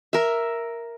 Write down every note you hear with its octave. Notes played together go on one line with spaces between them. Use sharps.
A#4 E5